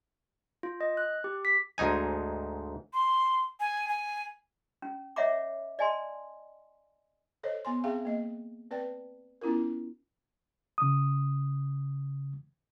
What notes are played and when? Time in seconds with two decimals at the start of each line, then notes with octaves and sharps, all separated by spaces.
0.63 F4
0.81 D#5
0.97 F#6
1.24 G4
1.45 B6
1.78 D2 G#2 D#4 G#5
2.93 C6
3.60 G#5
3.88 G#5
4.82 C#4
5.16 C#5 D#5 E5 F#5 A#5 D6
5.79 D5 D#5 G#5 A5 C6
7.43 A4 C5 C#5 D#5
7.65 B3 G#5 C6
7.84 C4 G#4 E5 F5 G5
8.05 A#3 D#5
8.71 C4 B4 D5 G5
9.41 B3 C#4 E4 F4 A#4
10.78 C#3 D#6